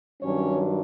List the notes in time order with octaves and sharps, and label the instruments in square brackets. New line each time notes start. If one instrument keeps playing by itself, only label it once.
[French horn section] G2 D#3 F#3 C#4 C#5